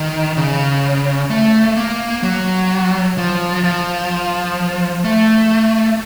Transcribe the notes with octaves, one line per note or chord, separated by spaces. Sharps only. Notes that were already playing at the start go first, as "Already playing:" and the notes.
Already playing: D#3
C#3
A3
A#3
F#3
F3
F3
A3